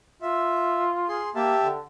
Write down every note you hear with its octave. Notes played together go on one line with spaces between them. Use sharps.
F4 E5
G#4 C6
A#3 G4 E5 A5
D3